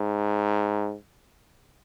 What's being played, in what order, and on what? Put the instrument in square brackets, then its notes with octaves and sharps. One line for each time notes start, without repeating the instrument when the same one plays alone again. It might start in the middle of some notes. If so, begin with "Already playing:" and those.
Already playing: [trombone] G#2